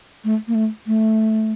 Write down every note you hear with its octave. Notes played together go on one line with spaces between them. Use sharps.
A3
A#3
A3
A3